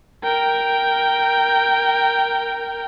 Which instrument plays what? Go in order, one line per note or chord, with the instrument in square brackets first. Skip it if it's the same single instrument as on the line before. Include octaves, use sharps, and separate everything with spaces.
[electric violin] A#4 G5